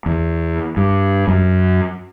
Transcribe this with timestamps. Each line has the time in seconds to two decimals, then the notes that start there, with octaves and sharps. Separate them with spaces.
0.06 E2
0.77 G2
1.28 F#2